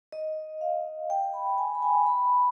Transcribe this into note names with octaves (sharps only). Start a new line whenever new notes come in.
D#5
F5
G5
B5
G#5
B5
G#5
B5